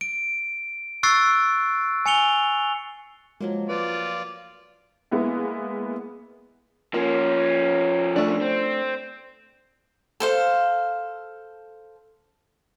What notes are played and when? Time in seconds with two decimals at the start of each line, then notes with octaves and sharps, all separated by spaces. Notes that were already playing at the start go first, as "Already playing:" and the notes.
0.01 D7
1.03 C#6 E6 F#6 A6 C7 D7
2.06 G#5 C#7 F7 G7
3.41 F3 F#3 G#3 A#3
3.69 F4 B4 D5
5.11 G#3 A#3 B3 E4 F5
6.94 F3 A#3 C#4
8.16 A3 D4
8.41 C4
10.20 A4 C5 F5